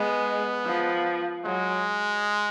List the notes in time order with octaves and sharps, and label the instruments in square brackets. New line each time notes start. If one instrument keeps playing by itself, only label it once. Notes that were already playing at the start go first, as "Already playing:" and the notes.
Already playing: [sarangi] G#3 [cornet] B3
[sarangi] F3
[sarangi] F#3 [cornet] G#3